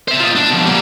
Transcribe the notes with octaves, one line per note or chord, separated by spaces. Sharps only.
C5 E5
D#4 F4
D4
B2 F3
G3 A#3